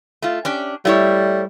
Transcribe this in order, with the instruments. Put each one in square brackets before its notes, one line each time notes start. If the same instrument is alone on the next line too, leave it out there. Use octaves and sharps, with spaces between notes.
[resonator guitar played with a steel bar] A3 F4
C#4 D4 G4
[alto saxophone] G3 [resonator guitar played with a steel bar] A3 E4 C#5